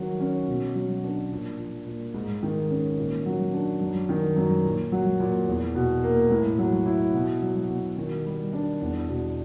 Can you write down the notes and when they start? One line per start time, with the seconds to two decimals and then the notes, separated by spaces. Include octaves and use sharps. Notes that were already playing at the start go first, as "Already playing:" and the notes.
Already playing: D#3 F#3
0.20 C#4
0.48 B2
0.75 F#3
1.03 D4
1.32 A#2
1.59 F3
1.86 A#2
2.14 G#2
2.43 D#3
2.70 C#4
2.98 A#2
3.26 F#3
3.53 D4
3.81 F#2
4.09 D#3
4.36 F#2
4.64 A#2
4.92 F#3
5.20 A#2
5.48 E2
5.75 B2
6.03 A#3
6.30 A2
6.58 F#3
6.86 E4
7.14 B2
7.42 F#3
7.69 B2
7.97 D#3
8.25 G3
8.53 D4
8.80 E2
9.08 B2